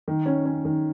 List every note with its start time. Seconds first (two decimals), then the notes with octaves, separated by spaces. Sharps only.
0.08 D#3
0.26 C#4
0.45 C#4
0.65 D#3